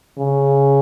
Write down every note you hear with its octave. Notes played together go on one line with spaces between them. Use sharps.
C#3